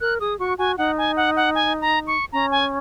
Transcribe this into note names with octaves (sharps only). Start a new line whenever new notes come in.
A#4 F#6
G#4 D#6
F#4 C#6
F#4 G#5
D#4 F#5
G#5
F#5
F#5
G#5
A#5
C#6
C#4 A#5
G#5